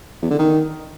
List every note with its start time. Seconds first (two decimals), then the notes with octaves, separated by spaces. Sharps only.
0.22 E2
0.30 D3
0.39 D#3